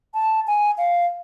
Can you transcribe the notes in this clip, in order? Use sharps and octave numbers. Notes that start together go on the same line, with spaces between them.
A5
G#5
F5